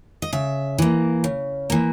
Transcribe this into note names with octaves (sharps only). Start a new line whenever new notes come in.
D#5
C#3 E5
E3 A#3
C#3
E3 A#3